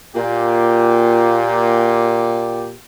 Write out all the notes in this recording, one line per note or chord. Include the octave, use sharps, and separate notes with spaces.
A#2 G4